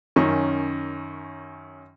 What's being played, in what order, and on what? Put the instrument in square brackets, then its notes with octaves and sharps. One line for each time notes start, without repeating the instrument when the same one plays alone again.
[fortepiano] F#2 D#3 C#4 C#6